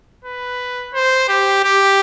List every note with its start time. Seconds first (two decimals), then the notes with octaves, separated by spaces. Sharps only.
0.25 B4
0.94 C5
1.29 G4
1.64 G4